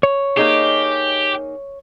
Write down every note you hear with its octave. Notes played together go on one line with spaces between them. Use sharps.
C#5
A#3 D#4 G4 G#4